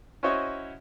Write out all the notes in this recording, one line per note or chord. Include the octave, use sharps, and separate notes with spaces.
C#4 E4 F#4 C5 C#5 D#5